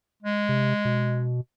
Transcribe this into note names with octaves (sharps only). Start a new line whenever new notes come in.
G#3
C3
B2